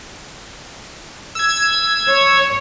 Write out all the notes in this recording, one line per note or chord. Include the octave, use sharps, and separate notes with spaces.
E6 G#6
C#5